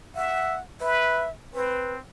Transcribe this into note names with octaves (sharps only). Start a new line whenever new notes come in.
E5 F#5
B4 E5
C4 B4